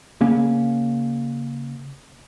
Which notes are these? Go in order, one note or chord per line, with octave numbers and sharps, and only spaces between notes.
C#3 A#3 C#4